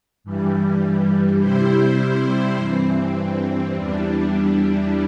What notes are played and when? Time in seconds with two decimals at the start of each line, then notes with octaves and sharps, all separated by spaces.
0.24 G2 E3 G3
1.39 C3 G3 E4 C5
2.56 G2 E3 C4
3.72 E2 E3 G3 D4